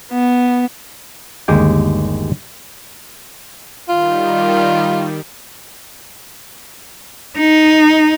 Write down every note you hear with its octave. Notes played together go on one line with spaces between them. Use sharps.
B3
G1 D#2 G#3 G4 G5
D#3 G3 F4
D#4